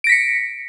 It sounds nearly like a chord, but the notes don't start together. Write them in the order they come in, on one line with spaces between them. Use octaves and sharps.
D7 A#6 B6 C#7